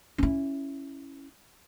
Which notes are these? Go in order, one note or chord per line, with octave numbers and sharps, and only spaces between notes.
C#4 E4